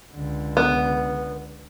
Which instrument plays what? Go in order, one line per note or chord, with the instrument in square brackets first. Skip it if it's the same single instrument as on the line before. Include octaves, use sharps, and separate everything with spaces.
[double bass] C#2 D3
[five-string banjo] B3